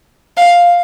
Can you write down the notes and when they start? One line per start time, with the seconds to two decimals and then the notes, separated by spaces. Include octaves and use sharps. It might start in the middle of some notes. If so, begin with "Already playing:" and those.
0.37 F5